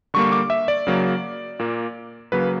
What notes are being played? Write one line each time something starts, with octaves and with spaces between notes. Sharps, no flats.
D3 G3 A#3 C#6
D6
E5
D5
C#3 F#3 A#3
A#2 A#3
C#3 F#3 A#3 B4